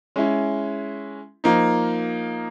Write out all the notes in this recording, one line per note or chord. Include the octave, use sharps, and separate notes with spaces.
G#3 C#4 E4
F3 A#3 D#4